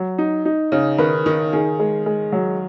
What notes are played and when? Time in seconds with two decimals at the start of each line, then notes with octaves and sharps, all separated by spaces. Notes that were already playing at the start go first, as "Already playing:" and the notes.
Already playing: F#3
0.18 D#4
0.45 D#4
0.72 C#3 D#4
0.98 D#3 B4
1.26 D#3 D#4
1.53 D#3 G#4
1.79 G#3
2.06 G#3
2.32 F#3